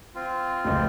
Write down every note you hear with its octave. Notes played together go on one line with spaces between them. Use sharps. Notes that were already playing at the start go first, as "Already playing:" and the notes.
C4 F4
F1 C#2